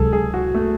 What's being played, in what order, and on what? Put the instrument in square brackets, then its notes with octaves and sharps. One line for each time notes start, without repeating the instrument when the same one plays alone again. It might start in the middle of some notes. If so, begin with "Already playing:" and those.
Already playing: [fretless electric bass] C#2 C3 F#3 [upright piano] G#4 A4
[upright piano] G#4
F#4
A3